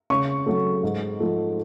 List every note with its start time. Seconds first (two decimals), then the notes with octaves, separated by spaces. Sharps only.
0.10 C#3 C#6
0.46 F#3 A3
0.83 G#2
1.20 F3 A3